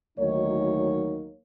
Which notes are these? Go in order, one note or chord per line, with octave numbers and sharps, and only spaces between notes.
D2 D#3 F#3 A#3 D#4 C#5